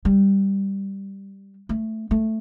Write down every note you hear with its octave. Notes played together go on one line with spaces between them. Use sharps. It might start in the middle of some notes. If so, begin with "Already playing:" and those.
G3
A3
A3